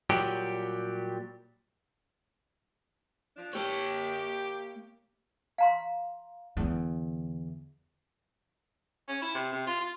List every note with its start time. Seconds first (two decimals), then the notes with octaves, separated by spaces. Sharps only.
0.10 A#2 F#3 G3 G4
3.36 F3 D4
3.53 A#3 G4 C#5
5.58 F5 A#5 C6
6.57 E2 D3
9.08 C#4
9.22 E4
9.35 C3
9.52 C3
9.67 F4
9.80 F4